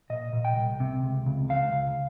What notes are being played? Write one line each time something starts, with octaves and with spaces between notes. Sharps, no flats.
A#2 D#5
A#2
G5
C2
C3
C#2
C#2
C#2 F5
C#2